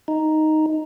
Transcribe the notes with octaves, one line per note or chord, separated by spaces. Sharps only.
D#4